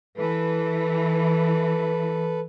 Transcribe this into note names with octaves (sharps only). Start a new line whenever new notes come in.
E3 A4 B4